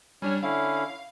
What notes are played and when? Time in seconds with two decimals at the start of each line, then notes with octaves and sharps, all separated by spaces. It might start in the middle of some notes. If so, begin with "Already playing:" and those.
0.22 G3 C#4 D4 C#5 G#5
0.43 D3 C#4 E4 F5